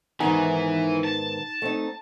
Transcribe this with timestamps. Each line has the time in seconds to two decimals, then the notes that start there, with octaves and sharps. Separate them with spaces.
0.20 G#2 D#3 E3 B3 D#4 G#5
1.04 A5
1.62 A3 C4 D#4